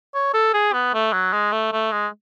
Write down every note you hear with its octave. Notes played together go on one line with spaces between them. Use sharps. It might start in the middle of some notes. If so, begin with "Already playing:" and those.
C#5
A4
G#4
B3
A3
F#3
G#3
A3
A3
G#3